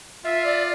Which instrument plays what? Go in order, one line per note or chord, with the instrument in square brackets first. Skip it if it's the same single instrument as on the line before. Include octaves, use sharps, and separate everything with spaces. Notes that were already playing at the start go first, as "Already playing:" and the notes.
[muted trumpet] F4 [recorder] E5
[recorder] D5